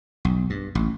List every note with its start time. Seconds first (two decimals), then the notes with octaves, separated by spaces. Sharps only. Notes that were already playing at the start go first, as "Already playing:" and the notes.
0.25 B1
0.50 G2
0.75 A1